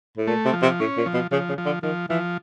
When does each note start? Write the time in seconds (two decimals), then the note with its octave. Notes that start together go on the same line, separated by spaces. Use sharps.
0.17 A2
0.27 A#2 A3
0.45 C3
0.53 F3
0.62 C3
0.80 A2 C#4
0.97 A#2
1.06 F3
1.14 B2
1.31 C#3 F3
1.49 C#3
1.58 F3
1.66 D3
1.83 D#3 F3
2.09 E3 F3